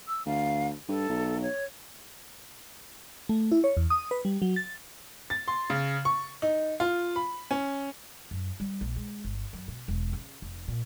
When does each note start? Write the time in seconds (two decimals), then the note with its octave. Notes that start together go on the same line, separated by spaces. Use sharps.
0.08 E6
0.26 D2 F5
0.89 G2 A4
1.10 B1
1.42 C#5
3.29 A3
3.52 E4
3.64 C#5
3.77 E2
3.90 D#6
4.11 B4
4.25 G3
4.42 F#3
4.56 A6
5.30 A6
5.48 C6
5.70 C#3
6.05 C#6
6.42 D#4
6.80 F4
7.16 B5
7.51 C#4
8.31 F#2
8.60 G3
8.81 A#1
8.96 G#3
9.24 G1
9.53 F#2
9.68 B2
9.88 E1
10.13 C#3
10.42 F1
10.68 A#2